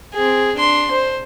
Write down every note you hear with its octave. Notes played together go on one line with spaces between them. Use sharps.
C4 G#4
D4 C6
C5